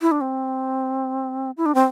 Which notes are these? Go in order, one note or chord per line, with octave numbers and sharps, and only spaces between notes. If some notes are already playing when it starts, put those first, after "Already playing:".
E4
D4
C4
E4
D4
C4